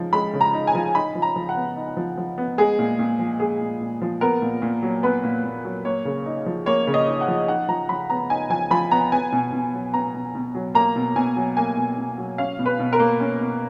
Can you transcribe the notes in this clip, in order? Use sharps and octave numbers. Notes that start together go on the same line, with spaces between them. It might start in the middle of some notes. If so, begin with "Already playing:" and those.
Already playing: C#3 F3 G#3 D#4
G#3 B5
C#3
A#5
D#4
G#5
F3
D#4 B5
F3
A#5
F3
F#5
B3
D#4
F3
F3
B3
G#3 G#4
A#2
A#2
F3
G#3 G#4
A#2
A#2
F3
B3 A#4
A#2
A#2
F#3
B3 B4
A#2
A#2
F#3
A#3 C#5
C#3
D#4
F3
A#3 C#5
C#3
D#5
D#4
F#5
F3
D#4 F#5
F3 A#5
F3 B5
B3 A#5
D#4 G#5
F3 G#5
F3 B5
B3 A#5
B3 G#5
B2
B2
F#3
B3 A#5
B2
B2
F#3
A#3 A#5
B2
B2 G#5
F#3
A#3 G#5
B2
B2
F#3
C#4 F5
B2
B4
B2
A#4
A#3
C#4
B2